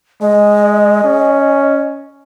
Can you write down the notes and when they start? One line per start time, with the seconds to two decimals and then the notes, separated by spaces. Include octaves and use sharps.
0.22 G#3 D#5
1.04 C#4